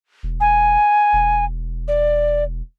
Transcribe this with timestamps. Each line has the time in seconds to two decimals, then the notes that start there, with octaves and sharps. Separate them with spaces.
0.23 E1
0.40 G#5
1.13 E1
1.88 D5